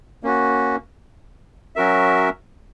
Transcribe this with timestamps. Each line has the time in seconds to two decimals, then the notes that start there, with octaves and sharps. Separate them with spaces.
0.23 A#3 C#4 F#4
1.76 F#3 C#4 F#4 A#4 E5